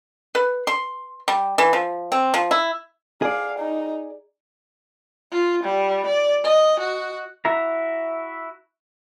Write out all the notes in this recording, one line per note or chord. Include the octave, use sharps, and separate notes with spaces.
B4
C6
G3
E3
F3
C4
F3
E4
G#4 D5 F5
D#4
F4
G3
D5
D#5
F#4
E4 F#4 E5 A#5